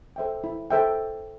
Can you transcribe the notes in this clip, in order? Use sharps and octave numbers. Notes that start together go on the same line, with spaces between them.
A4 C5 E5 G5
E4
A4 C5 E5 G5